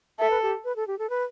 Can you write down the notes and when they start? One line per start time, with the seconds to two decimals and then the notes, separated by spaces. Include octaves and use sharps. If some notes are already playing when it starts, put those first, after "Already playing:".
0.19 A4 E5
0.30 B4
0.42 G4
0.64 B4
0.76 A4
0.87 G4
0.99 A4
1.10 B4